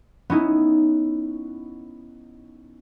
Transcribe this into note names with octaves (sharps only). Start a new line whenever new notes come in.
B3 C#4 D#4 E4